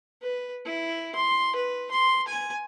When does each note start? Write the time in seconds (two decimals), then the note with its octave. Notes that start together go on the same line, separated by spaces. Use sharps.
0.22 B4
0.65 E4
1.15 C6
1.56 B4
1.91 C6
2.28 G#5